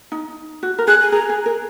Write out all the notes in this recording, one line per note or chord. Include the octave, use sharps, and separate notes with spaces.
D#4
F#4
A#4
G#4 F#6
G#5
G#4 A#5
G#4
A#4